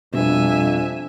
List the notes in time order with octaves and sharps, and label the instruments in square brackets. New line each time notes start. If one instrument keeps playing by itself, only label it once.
[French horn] F2 [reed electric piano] B2 G3 [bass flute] D4 [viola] E5 G#5